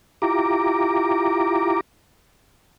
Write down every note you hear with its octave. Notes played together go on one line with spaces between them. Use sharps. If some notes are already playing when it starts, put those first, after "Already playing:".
E4 F4 G4 A#5 D6